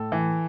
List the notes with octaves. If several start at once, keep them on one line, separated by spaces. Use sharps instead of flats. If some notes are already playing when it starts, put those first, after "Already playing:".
Already playing: A2 A4
E3